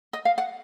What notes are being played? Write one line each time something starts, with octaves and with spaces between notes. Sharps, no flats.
D#5
F5
F#5